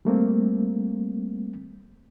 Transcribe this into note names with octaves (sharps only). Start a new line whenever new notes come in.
G3 A3 A#3 C4